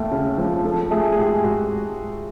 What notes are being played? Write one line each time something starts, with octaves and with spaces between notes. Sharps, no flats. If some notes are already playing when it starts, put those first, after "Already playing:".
Already playing: D#2 A3
C#3
F3
F3 A4
A3 G#4
G#4
G#2 G4
G#2 F#4